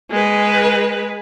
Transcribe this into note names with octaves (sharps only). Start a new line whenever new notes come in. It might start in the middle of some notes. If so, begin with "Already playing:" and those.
G#3 B4